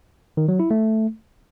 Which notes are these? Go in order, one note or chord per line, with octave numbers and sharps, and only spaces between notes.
D#3
F#3
E4
A3